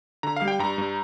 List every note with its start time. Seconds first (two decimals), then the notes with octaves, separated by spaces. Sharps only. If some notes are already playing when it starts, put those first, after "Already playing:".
0.23 D3 A#5
0.36 F5
0.41 G3
0.48 G5
0.59 G2 A#5
0.78 G2